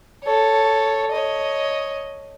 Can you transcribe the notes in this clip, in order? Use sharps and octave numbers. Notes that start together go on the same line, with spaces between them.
A4 C#5
C#5 D#5